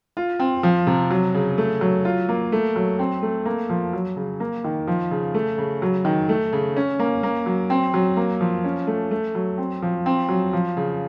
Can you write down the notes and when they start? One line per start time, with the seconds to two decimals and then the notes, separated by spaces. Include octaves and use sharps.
0.17 F4
0.39 C4
0.63 F3
0.87 C3
1.11 F#3
1.34 C#3
1.58 A3
1.81 F#3
2.05 F4
2.29 A#3
2.52 A3
2.76 F#3
2.99 C4
3.22 A3
3.46 A#3
3.70 F3
3.93 F#3
4.16 C#3
4.40 A#3
4.64 D#3
4.87 F3
5.11 C#3
5.34 A3
5.58 C#3
5.82 F#3
6.05 D#3
6.29 A3
6.53 C#3
6.76 C#4
6.99 A#3
7.23 A#3
7.46 F#3
7.70 C4
7.94 F#3
8.17 A#3
8.41 F3
8.64 C#4
8.87 A3
9.11 A3
9.35 F#3
9.58 C4
9.82 F3
10.06 C4
10.29 F#3
10.53 F3
10.77 C#3